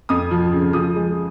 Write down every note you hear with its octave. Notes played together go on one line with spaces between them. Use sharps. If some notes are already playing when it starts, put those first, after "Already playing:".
F2 D#6
F3
C#3
F3 D#6
G#3